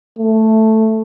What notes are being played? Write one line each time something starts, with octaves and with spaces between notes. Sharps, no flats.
A3